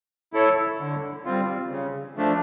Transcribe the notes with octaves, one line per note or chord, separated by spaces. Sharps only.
E4 A4 C#5
D3
G3 C4 F4
C#3
F3 A3 D4